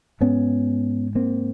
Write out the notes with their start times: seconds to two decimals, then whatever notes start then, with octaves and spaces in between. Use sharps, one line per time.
0.21 G#2 B3 C#4
1.15 A#3 C4